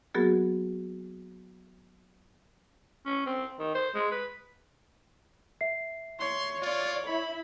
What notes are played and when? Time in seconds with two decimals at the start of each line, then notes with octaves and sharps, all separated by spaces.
0.14 F#3 A#3 B3 F#4 G#4 A#4
3.06 C#4
3.26 C4
3.59 D#3
3.74 C5
3.95 G#3
4.11 B4
5.61 E5 C7
6.20 C#5 C6
6.62 F4 D5
7.07 E4 B5